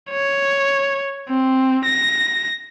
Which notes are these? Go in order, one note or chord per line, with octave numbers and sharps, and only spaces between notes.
C#5
C4
A#6